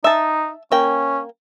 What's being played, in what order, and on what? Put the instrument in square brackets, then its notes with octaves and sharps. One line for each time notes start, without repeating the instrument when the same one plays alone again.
[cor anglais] D#4 [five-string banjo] E5 A5
[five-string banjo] A#3 G5 [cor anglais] C#4